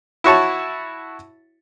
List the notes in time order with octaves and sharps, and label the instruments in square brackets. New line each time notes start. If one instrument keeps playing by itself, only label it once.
[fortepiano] E4 F#4 C#5 A5